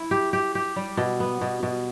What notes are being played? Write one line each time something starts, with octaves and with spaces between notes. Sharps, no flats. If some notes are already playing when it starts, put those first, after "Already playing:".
Already playing: E4
G4
G4
G4
G3
B2
B3
B2
B2